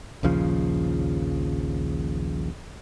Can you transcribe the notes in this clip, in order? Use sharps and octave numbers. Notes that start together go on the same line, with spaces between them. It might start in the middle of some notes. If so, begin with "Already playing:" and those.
A#1 D#2 C#3 F3